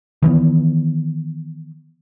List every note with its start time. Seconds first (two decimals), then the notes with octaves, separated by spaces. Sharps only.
0.22 D#3 E3 A3 B3